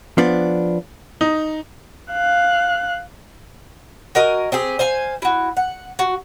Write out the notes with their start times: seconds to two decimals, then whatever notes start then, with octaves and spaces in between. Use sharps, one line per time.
0.18 F3 B3 D4
1.21 D#4
2.13 F5 F#6
4.15 F#4 A#4 D#5 G#5
4.52 C4 G4 G#4
4.79 C5 F5 G#5
5.22 E4 F#4
5.57 F#5
5.99 F#4